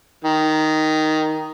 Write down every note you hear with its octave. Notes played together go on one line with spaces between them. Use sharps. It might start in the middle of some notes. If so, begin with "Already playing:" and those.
D#3